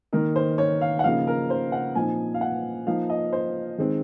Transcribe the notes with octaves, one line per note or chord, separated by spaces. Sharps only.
D#3 A#3 D#4 A#4
C5
C#5
F5
F#5
C#3 F3 A#3 D#4 F5
A#4
C5
F#5
A#2 F3 C4 D#4 G#5
F5
F#5
F3 A#3 D#4 F5
D#5
C5
D#3 G#3 C4